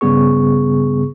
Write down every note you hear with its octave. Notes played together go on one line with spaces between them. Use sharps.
G2 C#3 G3 B3 G#4 C#6